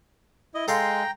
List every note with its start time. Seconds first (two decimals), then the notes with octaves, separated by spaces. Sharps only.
0.55 E4 D#5
0.68 G#3 A4 F5 G5 A#5 C6